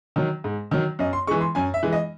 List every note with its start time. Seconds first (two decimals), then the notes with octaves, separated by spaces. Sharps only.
0.16 D#3 F#3
0.44 G#2
0.71 D#3 F#3
0.99 F#2 D#5
1.13 C6
1.27 E3 G#3 C#6
1.41 C6
1.55 F#2 G#5
1.74 E5
1.83 E3 G#3
1.93 D#5